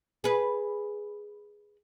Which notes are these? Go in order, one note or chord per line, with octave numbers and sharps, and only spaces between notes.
G#4 B4